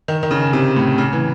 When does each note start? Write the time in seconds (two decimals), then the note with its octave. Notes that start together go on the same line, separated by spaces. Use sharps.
0.08 D#3
0.23 D#3
0.31 C#3
0.53 C3
0.76 A2
0.98 C#3
1.13 E3